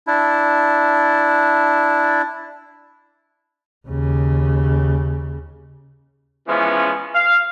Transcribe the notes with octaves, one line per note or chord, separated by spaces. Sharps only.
D4 E4
D#2 C#3
E3 F3 G#3 B3 C#4
F5